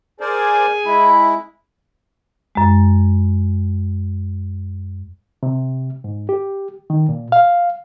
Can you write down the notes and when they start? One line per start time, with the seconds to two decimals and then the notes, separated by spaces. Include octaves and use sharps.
0.20 G#4 A#4 C5 D5 G#5
0.85 G#3 E4 B5
2.55 F#2 G#3
5.43 C3
6.04 G#2
6.29 G4
6.90 D#3
7.09 A#2
7.32 F5